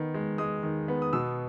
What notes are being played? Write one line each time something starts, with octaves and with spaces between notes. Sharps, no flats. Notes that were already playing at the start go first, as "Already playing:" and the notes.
Already playing: D#3 B3
G#3
G#3 D#6
D#3
B3
D#6
B2 E6